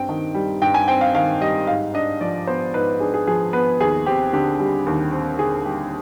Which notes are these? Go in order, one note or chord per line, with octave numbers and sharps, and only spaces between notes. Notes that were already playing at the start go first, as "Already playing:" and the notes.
Already playing: G2 C4 G5
D#3
G3
G2 G5
G#5
C4 G5
F5
D#3 F5
G3 D#5
G#2 F5
D4 D#5
F3 D5
B3 C5
G#2 B4
D4 G#4
G#4
F3 G#4
B3 B4
D#2 G#4
C4 G4
D3 G4
G3
D#2
C4
D3 G#4
G3 G4